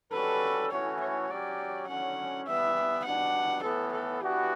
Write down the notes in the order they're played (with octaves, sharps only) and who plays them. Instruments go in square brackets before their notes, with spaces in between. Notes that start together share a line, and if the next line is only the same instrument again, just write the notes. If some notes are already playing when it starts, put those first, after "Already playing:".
[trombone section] G3 C#4 F#4 A4 [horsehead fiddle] B4
[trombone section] A2 E3 A3 C#4 F#4 [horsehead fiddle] C#5
[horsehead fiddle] C#5
[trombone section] F#3 C#4 G4 [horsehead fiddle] D5
[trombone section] D3 F#3 C#4 [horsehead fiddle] F#5
[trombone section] E3 G3 B3 [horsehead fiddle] E5
[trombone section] B2 G3 D4 [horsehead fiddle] F#5
[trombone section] A2 E3 B3 [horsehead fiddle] A4
[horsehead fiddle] A4
[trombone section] E3 B3 D4 F#4 [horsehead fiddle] G4